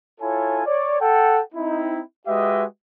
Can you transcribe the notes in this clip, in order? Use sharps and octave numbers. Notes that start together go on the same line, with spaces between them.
E4 F4 A4 C#5 G#5
C#5 D5
A4 F#5 G5
C4 D#4 E4
G#3 F#4 G4 B4 D#5 E5